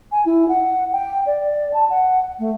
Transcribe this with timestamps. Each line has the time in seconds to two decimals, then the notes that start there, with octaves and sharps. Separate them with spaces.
0.12 G#5
0.26 E4
0.49 F#5
0.93 G5
1.26 D5
1.74 A5
1.90 F#5
2.39 A3